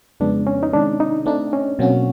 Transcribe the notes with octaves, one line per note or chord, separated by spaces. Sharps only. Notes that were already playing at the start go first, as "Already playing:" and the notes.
F2 C#3 F3 G#3 B3 D4
C#4
D#4
C3 D#3 G#3 D4
D#4
A3 C4 D4 D#4
C#4
B2 F#3 A#3 C4 C#4 F#4